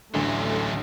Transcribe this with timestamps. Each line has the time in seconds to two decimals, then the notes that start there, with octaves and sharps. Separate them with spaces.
0.14 A1 D2 D3 F#3 A3